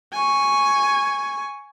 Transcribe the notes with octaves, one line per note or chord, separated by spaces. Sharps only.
G#5 C#6